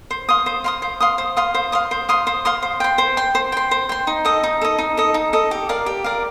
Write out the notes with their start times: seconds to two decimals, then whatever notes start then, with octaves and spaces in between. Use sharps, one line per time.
0.11 C5
0.29 F5 C6 D#6
0.46 C5
0.64 F5 C6 D#6
0.82 C5
1.00 F5 C6 D#6
1.18 C5
1.37 F5 C6 D#6
1.54 C5
1.72 F5 C6 D#6
1.91 C5
2.09 F5 C6 D#6
2.27 C5
2.45 F5 C6 D#6
2.62 C5
2.80 G5 C6
2.98 C5
3.17 G5 C6
3.35 C5
3.52 G5 C6
3.71 C5
3.89 G5 C6
4.07 D#4
4.25 A4 D#5
4.43 D#4
4.61 A4 D#5
4.78 D#4
4.97 A4 D#5
5.14 D#4
5.33 A4 D#5
5.51 G4
5.69 A#4 D5 F5
5.86 G4
6.04 A#4 D5 F5